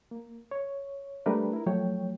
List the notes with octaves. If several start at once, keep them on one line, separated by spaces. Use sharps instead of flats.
A#3
C#5
G3 A3 D4 A#4 B4
E4 A#4
F3 F#3 A3 C#5 G5